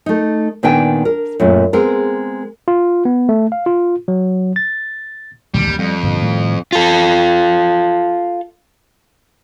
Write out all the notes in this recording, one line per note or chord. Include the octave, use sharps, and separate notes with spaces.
A3 D#4
A#2 D#3 B3 D4 G5 G#5
A#4
F#2 A#2 A3
G#3 B3 C4 A#4
F4
B3
A3
F5
F4
F#3
A6
D#1 D2 E3 G3
G#1 D#2 D#3
F2 G3
G1 G2 A#2
A2 D#3 G3
F4 A4